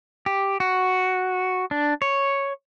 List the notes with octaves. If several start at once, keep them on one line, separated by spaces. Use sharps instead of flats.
G4
F#4
D4
C#5